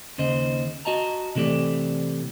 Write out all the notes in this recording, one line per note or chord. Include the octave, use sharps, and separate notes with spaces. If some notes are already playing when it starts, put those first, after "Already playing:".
D#2 C#3 C5 D#5
F#4 D#5 A5 A#5
C3 E3 A3 G4 D5